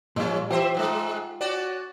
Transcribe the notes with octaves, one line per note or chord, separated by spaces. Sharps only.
A#2 F3 G3 C#4 F4
E3 F4 G4 C5 E5
G#2 G3 G#3
C#4 F#4 D5